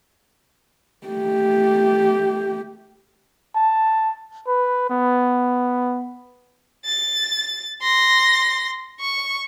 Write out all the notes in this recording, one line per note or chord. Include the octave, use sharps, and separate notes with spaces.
A3 G4
A5
B4
B3
A6
C6 A#6
C#6